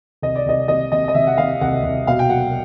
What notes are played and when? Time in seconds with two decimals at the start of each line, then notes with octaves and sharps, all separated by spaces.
0.22 C2 D#5
0.35 D5
0.46 C2 D#5
0.68 C3 D#5
0.92 C3 D#5
1.08 D#5
1.14 C3 E5
1.27 F#5
1.38 C3 F5
1.61 C2 F#5
1.83 C2
2.07 B2 F5
2.19 G5
2.29 F#3 F#5